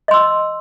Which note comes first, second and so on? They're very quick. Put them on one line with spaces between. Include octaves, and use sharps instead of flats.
D#5 C6 E6